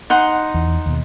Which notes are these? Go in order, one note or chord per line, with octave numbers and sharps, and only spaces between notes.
D#4 F#5 C6
E2
D#2 B2